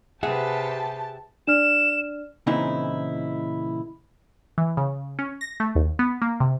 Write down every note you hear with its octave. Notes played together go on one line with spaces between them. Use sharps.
C3 G4 G#4 B4 E5 F#5 A5
D4 D5 F6 E7
A#2 C#3 E3 C4 D#4 E4
E3
C#3
C#4
A#6
A3
D#2
B3
A#3
C3